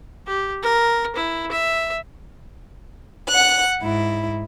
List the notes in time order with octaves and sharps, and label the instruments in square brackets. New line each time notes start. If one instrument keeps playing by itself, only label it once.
[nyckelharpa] G4
A#4
E4
E5
[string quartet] F#5 F#6
G#2 E4